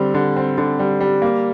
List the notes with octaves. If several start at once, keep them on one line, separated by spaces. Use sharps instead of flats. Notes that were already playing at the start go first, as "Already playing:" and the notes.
Already playing: D3 G3 C4
D3
C4
D3
G3
G3
A#3